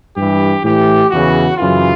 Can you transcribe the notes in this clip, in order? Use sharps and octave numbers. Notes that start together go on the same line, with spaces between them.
G2 E3 G4
A2 E3 G4
E2 C#3 E3 F#4
F#2 C#3 E3 F4